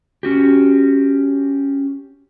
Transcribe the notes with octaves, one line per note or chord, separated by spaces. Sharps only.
C#4 F#4 G4